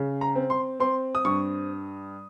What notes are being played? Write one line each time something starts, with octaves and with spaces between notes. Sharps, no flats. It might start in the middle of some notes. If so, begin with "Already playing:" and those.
Already playing: C#3
A#5
C4
C6
C4 C6
D#6
G2 C#6